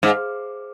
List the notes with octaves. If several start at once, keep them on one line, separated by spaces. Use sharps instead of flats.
G#2